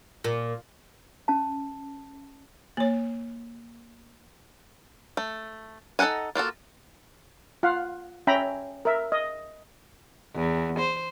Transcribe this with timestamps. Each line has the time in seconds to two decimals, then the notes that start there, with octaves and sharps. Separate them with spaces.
0.24 A#2
1.28 C#4 A5
2.77 A#3 C#5
5.17 A3
5.99 D#4 A4 B4 F#5 G#5
6.35 A#3 F4 F#4 A4
7.63 F4 F5 F#5
8.27 C#4 E5 G5 A#5 B5
8.85 A#4 E5
9.12 D#5
10.36 E2
10.79 C5